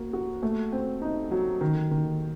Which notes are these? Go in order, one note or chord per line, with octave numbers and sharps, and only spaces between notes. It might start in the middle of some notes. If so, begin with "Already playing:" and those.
Already playing: A#3 F#4
F#4
A3
C4
D#4
F#3
D#3
D#3